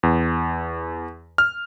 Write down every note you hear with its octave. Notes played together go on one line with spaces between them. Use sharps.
E2
F6